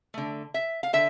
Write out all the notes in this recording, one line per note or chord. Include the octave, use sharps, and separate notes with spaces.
D3 A3
E5
F5
D3 E5